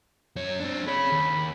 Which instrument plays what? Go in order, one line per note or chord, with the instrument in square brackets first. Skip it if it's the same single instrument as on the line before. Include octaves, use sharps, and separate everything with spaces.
[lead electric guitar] F#2 C#5
C4 D4
[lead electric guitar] G#4 C#5 [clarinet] B5
[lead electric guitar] D#2